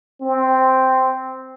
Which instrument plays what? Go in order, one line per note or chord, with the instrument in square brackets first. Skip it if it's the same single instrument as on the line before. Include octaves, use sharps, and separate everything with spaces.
[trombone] C4